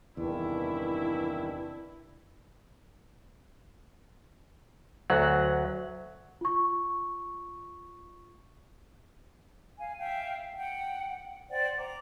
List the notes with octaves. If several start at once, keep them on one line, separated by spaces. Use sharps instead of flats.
E2 G2 C3 D#3 E3 D4 E4
D2 F#3 F#5
F4 C#6
F5 G#5
E5 F5 G5
F#5 G5
C5 D5 F#5 G5
A#5 D6